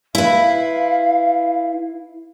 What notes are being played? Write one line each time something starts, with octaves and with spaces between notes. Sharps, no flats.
E4 B4 F5